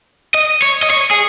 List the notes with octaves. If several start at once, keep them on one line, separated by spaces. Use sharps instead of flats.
D#5
C#5
D#5
C#5
G#4